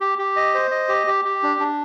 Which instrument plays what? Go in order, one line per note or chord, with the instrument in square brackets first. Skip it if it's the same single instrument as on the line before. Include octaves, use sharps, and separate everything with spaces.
[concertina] G4
G4
D#5
C5
D#5
G4
G4
G4
D4
D4